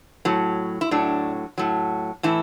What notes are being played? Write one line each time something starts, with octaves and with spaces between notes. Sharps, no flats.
A2 F#3
E4
A2 F#3 D4
A2 F#3
A2 E3 E4